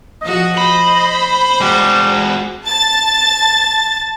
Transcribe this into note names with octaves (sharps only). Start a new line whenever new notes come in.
F3 F#4 D#5
C5 B5
G3 G#3 F#4
A5 A6